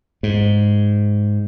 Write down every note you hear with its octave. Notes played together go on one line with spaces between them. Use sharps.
G#2